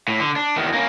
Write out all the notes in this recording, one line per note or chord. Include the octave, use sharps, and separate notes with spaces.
A2
D3
D4
E2 D#3
A#3 C#4